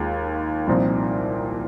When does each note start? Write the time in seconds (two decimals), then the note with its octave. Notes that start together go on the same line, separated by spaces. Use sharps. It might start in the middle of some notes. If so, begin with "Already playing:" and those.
Already playing: D#2 D#3 G#3 F4
0.67 C2 A#2 F3 C4 D#4